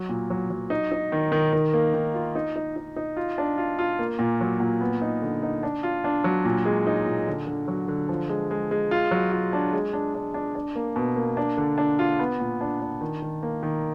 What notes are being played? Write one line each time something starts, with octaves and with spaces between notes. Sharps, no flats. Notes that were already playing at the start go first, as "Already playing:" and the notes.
Already playing: F#3
A#2
F#3
F#3
D#4
D#4
D#3
D#3
D#3
A#3
D#3
F4
D#4
D#4
D#4
D#4
F4
D4
F4
F4
A#3
A#2
F#3
A#2
B3
D#4
D3
D#4
D4
F4
D4
F#3
A#2
G#3
D#4
A#2
D3
D3
F#3
D3
F3
G#3
G#3
G#3
F4
F#3
F4
D4
G#3
D4
D4
D4
D4
A#3
B2
A#3
D4
D3
D4
F4
B3
A#2
D4
D4
D#3
D#3
A#3
D#3